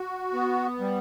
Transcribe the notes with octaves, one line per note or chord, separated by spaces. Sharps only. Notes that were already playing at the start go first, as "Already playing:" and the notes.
Already playing: F#4
B3
G3